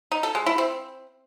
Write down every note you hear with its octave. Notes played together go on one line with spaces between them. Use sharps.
D#4
A4
G#3
E4
C4